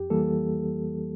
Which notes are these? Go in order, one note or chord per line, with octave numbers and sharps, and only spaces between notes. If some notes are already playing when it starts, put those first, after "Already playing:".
Already playing: F2 G4
E3 G3 A#3 A4